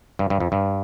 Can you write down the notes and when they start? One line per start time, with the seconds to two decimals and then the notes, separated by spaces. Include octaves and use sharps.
0.19 G2
0.30 G2
0.40 F2
0.52 G2